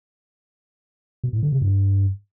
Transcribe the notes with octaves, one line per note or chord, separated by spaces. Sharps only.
B2
A2
D3
C3
G2